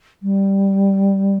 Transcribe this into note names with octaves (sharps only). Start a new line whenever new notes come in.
G3